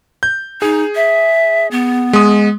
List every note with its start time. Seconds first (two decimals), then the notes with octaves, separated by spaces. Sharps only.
0.23 G6
0.62 D#4 G#4
0.95 E5
1.71 B3
2.13 G#3 D#6